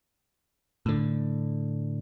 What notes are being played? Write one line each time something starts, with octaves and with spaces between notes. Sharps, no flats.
A2 D3